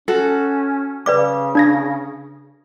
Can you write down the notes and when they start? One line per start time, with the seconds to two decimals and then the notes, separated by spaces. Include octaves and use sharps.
0.08 C#4 F#4 A4
1.06 C#3 B4 D5 D6
1.55 D4 G#6 A#6